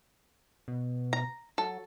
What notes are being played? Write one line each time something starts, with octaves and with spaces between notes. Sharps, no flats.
B2
A#5
F#3 A4